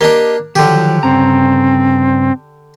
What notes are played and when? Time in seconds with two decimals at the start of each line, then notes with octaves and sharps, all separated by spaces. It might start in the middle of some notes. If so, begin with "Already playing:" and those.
0.01 A#3 D4 G4 D#5
0.56 D3 D#3 F3 F#3 G4
1.03 G2 C#3 C4 A#5